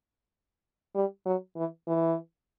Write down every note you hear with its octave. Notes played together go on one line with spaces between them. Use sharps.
G3
F#3
E3
E3